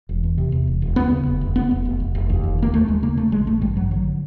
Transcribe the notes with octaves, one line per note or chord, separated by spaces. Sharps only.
E1
E2
C3
E2
E1
E1
D#2 B3
C#3
F1
F1
F1 B3
F1
F1
F1
F1
D#2
F1
C#3
A#3
D#2 A3
D#2 G#3
C#3 A#3
C#3 A3
A1 G#3
A1 A3
G2 G3
A1 F#3
D3 F#3